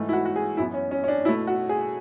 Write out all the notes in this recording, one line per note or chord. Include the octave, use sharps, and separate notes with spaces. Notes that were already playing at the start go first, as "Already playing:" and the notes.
Already playing: G#2 E3 A3
E4
F#4
F#4
G#4
F#2 E3 B3 E4
C#4
C#4
C#4
D4
B2 A3 E4
F#4
G#4